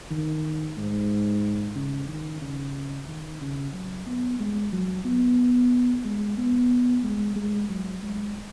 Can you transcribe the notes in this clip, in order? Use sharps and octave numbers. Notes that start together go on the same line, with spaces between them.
D#3
G#2
C#3
D#3
C#3
D#3
C#3
F#3
B3
G#3
F#3
B3
G#3
B3
G#3
G#3
F#3
G#3